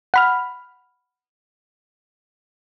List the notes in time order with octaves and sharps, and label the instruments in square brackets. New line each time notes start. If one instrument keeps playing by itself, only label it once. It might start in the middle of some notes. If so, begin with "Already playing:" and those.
[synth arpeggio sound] F#5 B5 F6